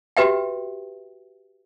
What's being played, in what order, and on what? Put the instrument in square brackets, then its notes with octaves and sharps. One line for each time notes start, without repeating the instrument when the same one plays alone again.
[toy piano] F#4 G4 B4 E5 G5